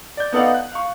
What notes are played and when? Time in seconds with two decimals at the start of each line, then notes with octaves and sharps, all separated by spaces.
0.17 D5 G6
0.32 B3 D#4 A4 D5 F5 F#5
0.54 F#6
0.72 F5 C#6